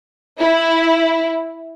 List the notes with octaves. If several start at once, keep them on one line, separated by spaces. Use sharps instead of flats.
E4